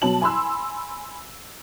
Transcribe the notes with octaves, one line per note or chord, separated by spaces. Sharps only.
B2 F#3 A5 F#7
G#5 B5 C6 E6